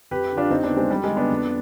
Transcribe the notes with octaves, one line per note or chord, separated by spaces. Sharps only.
F2 G4 B4
D3
D4 F4
F2 C4 D#4
B3 D4
D#3
G#3 C4
F2 G3
G#3
D#3
B3 D4
F2